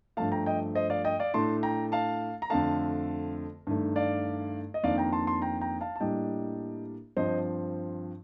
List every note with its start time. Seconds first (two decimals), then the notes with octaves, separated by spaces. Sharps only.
0.17 G2 F3 A3 F5 A5
0.32 G5 A#5
0.46 D#5 G5
0.75 C5 D#5
0.90 D5 F5
1.05 D#5 G5
1.19 D5 F5
1.34 A2 A3 D4 A5 C6
1.63 G5 A#5
1.92 F5 A5
2.42 A#5
2.50 F2 D3 A3 F5 A5
3.67 G2 D#3 A3
3.96 D5 F5
4.74 D#5
4.83 F2 D#3 A#3 D4 D5 F5
4.98 G5 A#5
5.12 A5 C6
5.27 A5 C6
5.42 G5 A#5
5.61 G5 A#5
5.81 F5 A5
5.96 A5
6.00 A2 G3 A#3 D4 D#5 G5
7.17 G2 F3 C4 C5 D#5